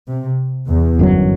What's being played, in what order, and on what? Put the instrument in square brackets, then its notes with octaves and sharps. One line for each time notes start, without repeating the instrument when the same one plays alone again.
[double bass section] C3
E2
[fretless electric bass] G1 F#2 D3 F#3